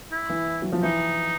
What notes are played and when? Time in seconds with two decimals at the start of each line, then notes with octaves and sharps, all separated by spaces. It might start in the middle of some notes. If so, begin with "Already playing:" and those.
0.12 E4
0.29 E3
0.62 F#3
0.72 F3
0.83 E3 D#4